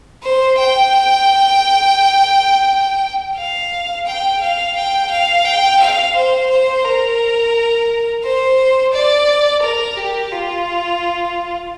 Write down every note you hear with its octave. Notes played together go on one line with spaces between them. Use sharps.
C5
G5
F5
G5
F5
G5
F5
G5
F5
C5
C5
A#4
C5
D5
A#4
G4
F4